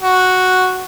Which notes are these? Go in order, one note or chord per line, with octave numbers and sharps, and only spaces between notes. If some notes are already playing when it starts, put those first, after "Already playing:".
F#4